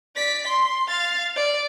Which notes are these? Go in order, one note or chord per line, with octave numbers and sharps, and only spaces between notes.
D5 B6
C6
F5 A6
D5